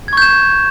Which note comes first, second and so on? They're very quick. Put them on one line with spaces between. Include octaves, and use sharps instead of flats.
G#6 C#6 G6 E7